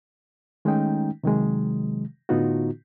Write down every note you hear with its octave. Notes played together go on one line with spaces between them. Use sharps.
D#3 G#3 A3 C#4 D#4 G5
C3 D#3 F#3 G#3
A2 D3 B3 D#4 F4 F#4